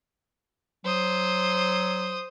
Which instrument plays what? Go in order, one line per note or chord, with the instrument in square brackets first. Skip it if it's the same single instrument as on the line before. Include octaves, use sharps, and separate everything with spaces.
[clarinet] F#3 [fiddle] C5 D#6